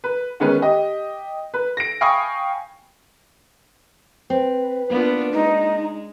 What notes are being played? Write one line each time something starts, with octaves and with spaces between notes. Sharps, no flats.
B4
D#3 G#3 B3 C#4 B4
G4 D#5
B4
A#6 D7
F5 G5 G#5 B5 C#6 D#6
C4 B4
A#3 B3 D4 F4
G#3 D#4